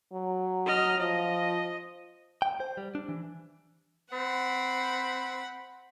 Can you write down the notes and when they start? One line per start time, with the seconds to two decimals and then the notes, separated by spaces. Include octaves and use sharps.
0.13 F#3
0.66 D#5 F6
0.99 F3 D#5
2.42 G5
2.60 C5
2.77 G3
2.95 D4
3.09 E3
4.13 C4 F#5 B5